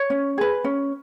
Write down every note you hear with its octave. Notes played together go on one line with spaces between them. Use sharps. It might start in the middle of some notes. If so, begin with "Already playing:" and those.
Already playing: C#5
C#4
G#4 B4
C#4